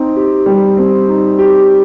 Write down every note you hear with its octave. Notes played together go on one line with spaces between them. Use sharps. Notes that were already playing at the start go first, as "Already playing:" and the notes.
Already playing: C4 D#4
G4
G3
C4
D#4
G4